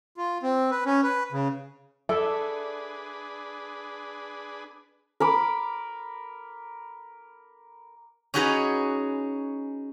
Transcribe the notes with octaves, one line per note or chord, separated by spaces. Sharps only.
F4
C4
B4
C#4
B4
C#3
D4 G#4 A4 B4 D5 E5
A#4 B5 D6
C#4 D#4 F#4 G#4 B4